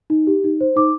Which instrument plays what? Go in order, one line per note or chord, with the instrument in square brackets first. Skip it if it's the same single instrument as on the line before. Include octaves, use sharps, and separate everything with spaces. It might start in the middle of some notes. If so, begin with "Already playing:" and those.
[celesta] D#4
G4
D#4
C5
D#4 D6